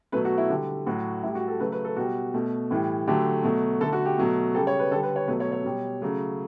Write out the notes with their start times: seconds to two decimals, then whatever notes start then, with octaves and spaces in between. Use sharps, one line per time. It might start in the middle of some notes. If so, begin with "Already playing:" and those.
0.12 B2 F#3 A3 B4
0.25 F#4
0.38 E4
0.50 D3 G3
0.87 A2 F#3 A3 F#4
1.23 A2 G3 E4
1.35 F#4
1.48 A4
1.60 C#3 F#3 A3 B4
1.72 B4
1.85 A4
1.96 B2 G3 F#4
2.34 B2 A3
2.71 A2 E3 G3
3.07 D3 F#3 A3 G4
3.44 B2 F#3 A3
3.81 D3 A3 A4
3.93 F#4
4.05 G4
4.18 B2 F#3 A3
4.55 C#3 G3 A4
4.67 C#5
4.79 B4
4.91 D3 G3 A4
5.03 B4
5.16 C#5
5.28 B2 F#3 A3 B4
5.40 C#5
5.52 C#5
5.65 B2 G3
6.02 C#3 F#3 A3